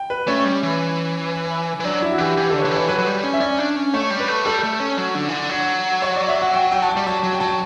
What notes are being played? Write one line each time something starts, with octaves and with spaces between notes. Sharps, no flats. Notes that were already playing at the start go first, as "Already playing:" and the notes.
Already playing: G5
B4
A3 C#4
G3
E3
E3
F#3 D4
E4
F#4
E3 G4
E3 G4
D3 A4
C#5
D3 B4
E3
C#5
F#3 B4
F#3
G3
C#4
E5
C#4 D5
D4
C#4
A3 C#5
G3
B4
A3
G3 A4
A3
C#4
F#3
D3
E3
D3
F#3
C#5
D5
E5
F#5
G5
G5
A5
G5
G3
F#3 A5
F#3
G5
F#3 A5
G5